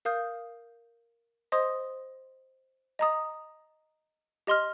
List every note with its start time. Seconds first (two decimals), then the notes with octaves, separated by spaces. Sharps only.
0.05 A#4 F5 D#6 G6
1.52 C5 D#5 C6 D#6
2.99 D#5 A#5 D#6
4.47 G4 D#5 C6 F6